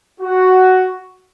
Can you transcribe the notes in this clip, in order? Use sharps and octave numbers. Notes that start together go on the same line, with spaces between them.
F#4